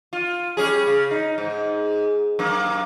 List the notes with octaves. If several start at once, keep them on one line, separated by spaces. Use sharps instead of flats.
F4
G3 C#4 G#4
C#3
D#4
G#2
F#2 A#3